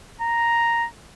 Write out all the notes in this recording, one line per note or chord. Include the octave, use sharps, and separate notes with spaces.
A#5